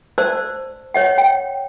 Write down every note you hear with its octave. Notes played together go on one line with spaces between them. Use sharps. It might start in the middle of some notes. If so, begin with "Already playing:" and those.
C5 D5 A5 E6
C#5 D#5 F#5
G5